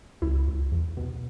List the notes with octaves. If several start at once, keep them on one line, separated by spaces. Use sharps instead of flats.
C#2 E4
C#2
E2
B2